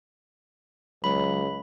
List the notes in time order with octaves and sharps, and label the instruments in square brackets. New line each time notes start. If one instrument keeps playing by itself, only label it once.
[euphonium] C#2 [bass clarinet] F#3 [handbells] B5